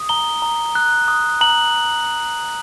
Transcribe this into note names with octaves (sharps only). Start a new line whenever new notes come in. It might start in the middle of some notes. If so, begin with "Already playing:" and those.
Already playing: D#6
A#5 G7
A#5
F#6
D#6
A#5 F#7